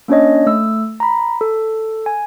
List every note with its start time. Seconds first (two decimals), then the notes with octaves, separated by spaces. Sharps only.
0.08 A#3 C#4 D4 C#5 D#5
0.46 A3 E6
1.00 A#5 B5
1.41 A4
2.06 G#5